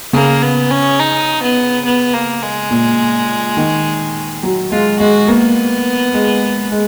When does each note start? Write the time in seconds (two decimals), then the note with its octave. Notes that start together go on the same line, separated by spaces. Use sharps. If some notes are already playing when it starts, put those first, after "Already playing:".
0.13 C#3 A#3
0.42 B3
0.71 C#4
1.00 D#4
1.42 B3
1.85 B3
2.14 A#3
2.42 G#3
2.71 A#2
3.57 D#3
4.43 F#3
4.71 G#3 F4
5.00 G#3 F#4
5.28 A#3 B3
6.14 G#3
6.72 G#3